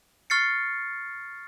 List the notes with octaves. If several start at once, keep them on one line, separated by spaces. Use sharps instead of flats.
C#6 F6 A6 C7 C#7